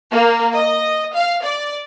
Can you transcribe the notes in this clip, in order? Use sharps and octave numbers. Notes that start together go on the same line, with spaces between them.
A#3
D#5
F5
D5